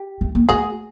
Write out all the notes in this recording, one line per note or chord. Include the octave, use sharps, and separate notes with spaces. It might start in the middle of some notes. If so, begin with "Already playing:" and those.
Already playing: G4
A3
A#3
A3 F#4 G#4